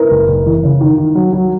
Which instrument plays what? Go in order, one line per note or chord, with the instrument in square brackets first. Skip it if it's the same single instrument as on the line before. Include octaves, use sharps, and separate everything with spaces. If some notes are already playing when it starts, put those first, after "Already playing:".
Already playing: [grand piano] E4 [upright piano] A#4 B4
[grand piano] F#1
F#1
E3
C#3
D#3
D#3
F#3
F#3